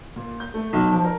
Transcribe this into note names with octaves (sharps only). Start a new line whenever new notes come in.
A#2
G6
A3
B1
F3
A#4